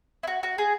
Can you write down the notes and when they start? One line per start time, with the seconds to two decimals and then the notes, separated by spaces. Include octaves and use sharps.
0.23 E4
0.27 F#4
0.43 F#4
0.58 G#4